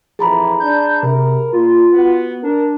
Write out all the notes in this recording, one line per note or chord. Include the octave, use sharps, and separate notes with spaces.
F2 E3 G#4 A#5 B5
D4 G6
C3 A#4
A#2 F4
B3 F#4
D4 A#4